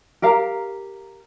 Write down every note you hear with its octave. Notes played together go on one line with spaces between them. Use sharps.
G4 A#4 F5 A#5